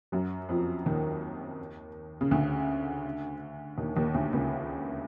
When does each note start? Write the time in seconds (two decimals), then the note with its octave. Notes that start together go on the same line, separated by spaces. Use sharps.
0.12 F#2 F#3
0.49 F2 F3
0.86 D#2 D#3
2.21 C#3
2.31 D2 D3
3.78 D#2 D#3
3.96 D#2 D#3
4.14 D2 D3
4.33 C#2 C#3